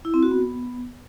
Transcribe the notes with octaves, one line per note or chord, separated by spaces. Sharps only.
E4
C4
F#4
B3